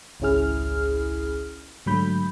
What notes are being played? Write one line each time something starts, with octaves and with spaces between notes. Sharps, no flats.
G#1 C#2 C#4 E4 G#4 F6
G#2 D3 F#3 A3 B5 G6